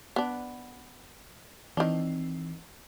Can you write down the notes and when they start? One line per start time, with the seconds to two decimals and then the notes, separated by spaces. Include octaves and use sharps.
0.16 B3 D4
1.77 D#3 E3 C4 D4